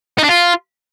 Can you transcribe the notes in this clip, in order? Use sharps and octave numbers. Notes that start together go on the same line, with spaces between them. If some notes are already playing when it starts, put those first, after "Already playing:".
D#4
D4
F4